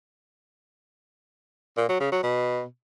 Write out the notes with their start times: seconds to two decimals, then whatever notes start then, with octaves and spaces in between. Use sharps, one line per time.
1.77 A#2
1.89 F#3
2.00 C#3
2.12 F#3
2.23 B2